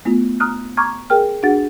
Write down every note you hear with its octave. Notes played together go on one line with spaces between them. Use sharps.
A3 B3 E4 F4
A#5 D#6 F6 F#6
A#5 C#6 D6 F6 G#6
G#4 A#4 G5 F6
D4 F#4 G#4 F#5 A6